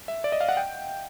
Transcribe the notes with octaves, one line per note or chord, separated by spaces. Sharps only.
E5
D5
D#5
F5
F#5
G5